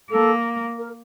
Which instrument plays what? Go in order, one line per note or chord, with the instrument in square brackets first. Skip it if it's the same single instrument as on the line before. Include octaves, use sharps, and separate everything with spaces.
[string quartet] A#3 [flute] A4
[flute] A#4